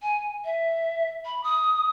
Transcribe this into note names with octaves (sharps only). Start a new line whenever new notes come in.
G#5
E5
B5
D#6